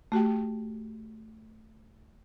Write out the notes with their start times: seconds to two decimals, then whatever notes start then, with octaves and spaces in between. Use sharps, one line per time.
0.12 A3 F#4 G4 G5